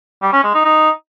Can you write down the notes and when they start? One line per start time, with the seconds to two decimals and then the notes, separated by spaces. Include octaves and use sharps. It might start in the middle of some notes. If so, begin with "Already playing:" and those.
0.22 G3
0.33 C#4
0.44 G#3
0.54 D#4
0.65 D#4